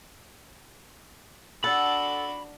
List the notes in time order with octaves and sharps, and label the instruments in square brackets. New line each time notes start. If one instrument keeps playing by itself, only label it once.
[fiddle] D4 F#4 [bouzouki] A4 [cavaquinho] F#5 [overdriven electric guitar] B5